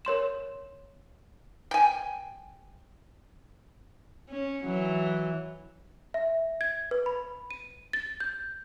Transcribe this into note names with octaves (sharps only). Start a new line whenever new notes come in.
A#4 C#5 C6 E7
G5 G#5
C#4
E3 F#3
E5
G#6
B4
B5
D#7
A6
G6